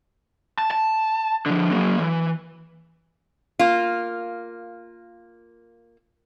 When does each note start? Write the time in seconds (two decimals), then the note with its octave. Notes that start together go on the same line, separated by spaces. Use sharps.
0.58 A5
0.71 A5
1.46 D3 F3
1.72 F#3 A#3
1.99 E3
3.59 A#3 F4